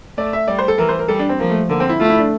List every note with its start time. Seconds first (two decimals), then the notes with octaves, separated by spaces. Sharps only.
0.18 A3 D5
0.33 E5
0.48 G3 D5
0.59 C5
0.68 A4
0.78 E3 A#4
0.89 C5
0.99 A#4
1.08 G3 A4
1.19 D4
1.29 C4
1.39 F3 A#3
1.50 A3
1.69 D3 A#3
1.80 C4
1.89 E4
2.00 A3 F4
2.10 E4
2.19 D4